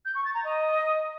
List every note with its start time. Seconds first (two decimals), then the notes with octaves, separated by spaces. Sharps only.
0.05 G6
0.15 C#6
0.25 A6
0.34 A#5
0.44 D#5